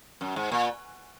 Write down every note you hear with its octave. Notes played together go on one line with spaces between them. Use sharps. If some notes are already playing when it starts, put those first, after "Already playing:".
F#2
G#2
A#2